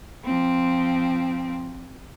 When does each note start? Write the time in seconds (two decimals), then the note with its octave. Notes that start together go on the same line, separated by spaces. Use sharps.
0.25 F3 C4